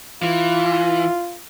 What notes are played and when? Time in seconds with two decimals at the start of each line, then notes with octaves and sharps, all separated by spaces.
0.23 E3 F4